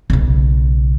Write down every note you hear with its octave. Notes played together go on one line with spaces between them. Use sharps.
B1 C#3